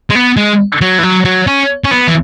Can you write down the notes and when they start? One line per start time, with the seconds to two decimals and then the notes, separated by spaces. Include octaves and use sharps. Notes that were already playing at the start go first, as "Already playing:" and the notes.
0.10 G#3
0.15 B3
0.37 G#3
0.81 F#3
0.98 E3
1.03 F#3
1.25 F#3
1.47 C#4
1.84 C#4
1.91 B3
2.08 E3